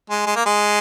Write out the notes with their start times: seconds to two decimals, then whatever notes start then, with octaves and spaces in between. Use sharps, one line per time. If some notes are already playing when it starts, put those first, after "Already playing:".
0.10 G#3
0.26 G#3
0.36 A#3
0.46 G#3